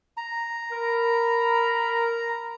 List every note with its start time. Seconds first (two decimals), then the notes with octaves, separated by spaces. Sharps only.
0.17 A#5
0.72 A#4 B5